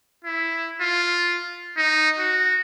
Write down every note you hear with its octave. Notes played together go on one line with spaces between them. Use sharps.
E4
F4
D#4
F#4